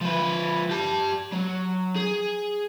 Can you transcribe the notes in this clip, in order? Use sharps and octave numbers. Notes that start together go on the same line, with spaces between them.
F3 B4
G4 A5
F#3
G#4